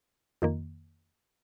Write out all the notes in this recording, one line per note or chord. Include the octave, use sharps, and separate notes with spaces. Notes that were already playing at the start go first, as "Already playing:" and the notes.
F2 D#3 A#3